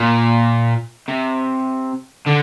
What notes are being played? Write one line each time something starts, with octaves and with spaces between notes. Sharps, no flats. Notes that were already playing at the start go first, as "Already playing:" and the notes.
Already playing: A#2
C3
D3